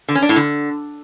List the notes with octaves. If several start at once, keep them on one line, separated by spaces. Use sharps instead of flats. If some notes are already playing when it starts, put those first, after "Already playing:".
D3
C#4
D4
A2
D3